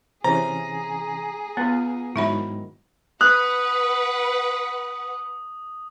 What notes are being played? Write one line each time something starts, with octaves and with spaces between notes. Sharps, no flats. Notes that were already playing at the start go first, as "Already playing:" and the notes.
C3 E3 C#4 G#4 C5 A#5
B3 F4 B4 F#5
G#2 D#3 F#3 E4 E5 B5
B4 F#5 D#6 F#6